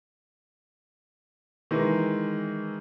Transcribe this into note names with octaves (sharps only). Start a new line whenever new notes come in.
D#3 E3 G#3